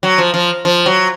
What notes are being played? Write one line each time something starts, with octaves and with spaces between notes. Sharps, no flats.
F#3
F3
F3
F3
F#3